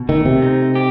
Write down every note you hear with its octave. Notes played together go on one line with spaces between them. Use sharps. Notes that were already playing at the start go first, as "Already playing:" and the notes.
Already playing: B2
D#3 A3
C3
D#4
G4